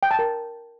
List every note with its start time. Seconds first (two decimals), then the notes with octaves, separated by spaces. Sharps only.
0.03 G5
0.11 A5
0.19 A#4